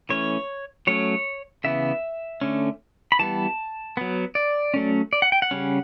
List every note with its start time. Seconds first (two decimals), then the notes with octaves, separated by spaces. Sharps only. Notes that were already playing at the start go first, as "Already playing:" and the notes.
0.09 E3 A3 C#4 C#5
0.87 F#3 A3 C#4 C#5
1.64 C#3 E3 B3 E5
2.41 D3 A3 C#4
3.12 B5
3.19 E3 G3 B3 A5
3.97 F#3 B3
4.35 D5
4.74 F#3 A3 C#4
5.13 D5
5.22 F#5
5.32 G5
5.42 F#5
5.51 C#3 G3 C#4